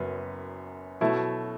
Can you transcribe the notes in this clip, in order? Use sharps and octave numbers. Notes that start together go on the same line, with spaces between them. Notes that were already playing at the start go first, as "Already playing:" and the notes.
Already playing: F#1 F#2 F#3 B3
B2 F#3 A3 E4